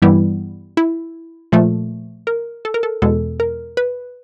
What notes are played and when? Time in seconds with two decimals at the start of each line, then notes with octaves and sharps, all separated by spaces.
0.02 G2 E3 G3 B3 E4
0.77 E4
1.52 A#2 F3 A3
2.27 A#4
2.65 A4
2.74 A#4
2.83 A4
3.02 E2 B2 G#3 A4
3.40 A#4
3.77 B4